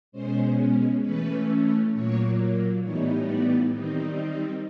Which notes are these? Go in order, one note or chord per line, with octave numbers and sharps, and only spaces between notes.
B2 G#3 C#4 C5
E3 A3 C#4 B4
A#2 F#3 A#3 C#5
A2 E3 G3 B3 D#4 C#5
D5
D#3 G3 C4 D#4